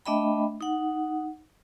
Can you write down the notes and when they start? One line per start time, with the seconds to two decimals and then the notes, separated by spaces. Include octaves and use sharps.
0.06 A3 D4 D#5 E5 G5 B5
0.61 D#4 F#5